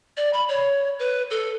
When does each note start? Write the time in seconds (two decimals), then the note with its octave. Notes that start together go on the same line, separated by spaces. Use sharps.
0.17 D5
0.33 B5
0.49 C#5
0.99 B4
1.31 A4